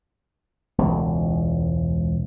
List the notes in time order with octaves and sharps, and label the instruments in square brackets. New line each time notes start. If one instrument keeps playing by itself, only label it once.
[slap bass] E1 C#2